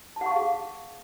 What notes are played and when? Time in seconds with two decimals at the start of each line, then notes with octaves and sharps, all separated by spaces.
0.16 A5
0.21 F#5
0.26 C#6
0.31 F5
0.36 G#4